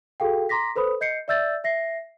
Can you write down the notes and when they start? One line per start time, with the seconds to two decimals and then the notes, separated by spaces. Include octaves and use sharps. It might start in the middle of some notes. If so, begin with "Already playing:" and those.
0.20 F#4 G#4 A4 F5 G5
0.49 A#5 C6 D6 A#6 B6
0.76 A4 B4 C5 B5 D#6
1.01 D#5 G6 C7 C#7
1.28 D5 E5 E6 G6 A6
1.64 E5 A#6 C7